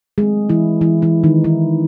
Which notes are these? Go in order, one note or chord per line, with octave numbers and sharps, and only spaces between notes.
D#3 F#3 G#3 A3 C4 G#4
E3 E4
E3 E4
E3 E4
D#3 D#4
E3 E4